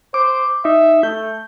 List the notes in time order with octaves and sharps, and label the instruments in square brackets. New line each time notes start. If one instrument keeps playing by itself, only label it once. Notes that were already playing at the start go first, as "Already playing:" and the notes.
[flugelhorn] C5 [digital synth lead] D6
[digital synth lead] D#4 [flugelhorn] E5
[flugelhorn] A3 [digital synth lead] G6